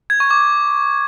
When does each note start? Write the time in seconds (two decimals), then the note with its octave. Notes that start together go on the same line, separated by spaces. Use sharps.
0.10 G#6
0.20 C#6
0.31 D6